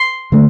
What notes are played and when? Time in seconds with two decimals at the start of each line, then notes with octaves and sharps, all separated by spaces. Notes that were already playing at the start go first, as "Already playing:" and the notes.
Already playing: C6
0.32 D3 A3